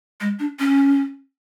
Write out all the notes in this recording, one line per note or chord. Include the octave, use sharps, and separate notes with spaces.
G#3
D4
C#4